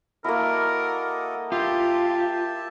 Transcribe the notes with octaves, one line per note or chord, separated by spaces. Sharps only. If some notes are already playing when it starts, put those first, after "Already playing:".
A#3 E4 F#4 A4 A#4 D#5
F4 G4 E5 A5